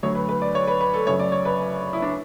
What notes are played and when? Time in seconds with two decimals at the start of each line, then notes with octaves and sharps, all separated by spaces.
0.03 D2 D3 F#3 C#5
0.15 B4
0.29 B4
0.42 D5
0.55 C#5
0.67 B4
0.81 B4
0.94 A4
1.07 F#2 C#3 F#3 C#5
1.20 D5
1.32 C#5
1.45 B4
1.93 E4
2.02 D4